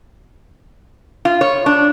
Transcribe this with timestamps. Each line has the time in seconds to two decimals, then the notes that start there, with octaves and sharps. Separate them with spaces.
1.25 F4
1.41 C#5
1.66 D4